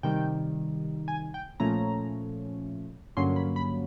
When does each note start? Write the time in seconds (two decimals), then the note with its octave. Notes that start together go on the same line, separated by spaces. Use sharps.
0.03 C3 D#3 G3 G5
1.08 G#5
1.34 G5
1.60 A#2 F3 A3 C#4 A#5
3.17 G2 D3 F#3 A#3 C#4 C6
3.36 B5
3.56 B5